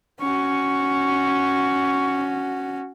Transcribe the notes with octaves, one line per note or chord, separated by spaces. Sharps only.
C#4 F#4 C#6